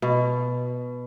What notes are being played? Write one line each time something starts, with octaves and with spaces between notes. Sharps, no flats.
B2